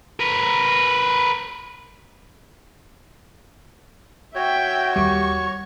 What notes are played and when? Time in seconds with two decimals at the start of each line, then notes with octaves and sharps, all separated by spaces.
0.19 A#4 B4
4.35 F#4 C#5 E5 G5
4.96 D#2 G3 C#6